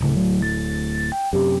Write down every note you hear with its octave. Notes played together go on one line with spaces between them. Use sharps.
D1 A2 C#3
F#3
A6
G5
F#2 C3 G4